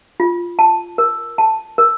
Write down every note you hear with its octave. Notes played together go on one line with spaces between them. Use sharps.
F4
A5
A#4
A5
A#4